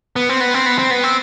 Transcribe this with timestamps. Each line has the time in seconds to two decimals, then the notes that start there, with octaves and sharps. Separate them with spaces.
0.16 B3
0.29 C4
0.41 B3
0.54 C4
0.66 B3
0.78 C4
0.91 B3
1.04 C4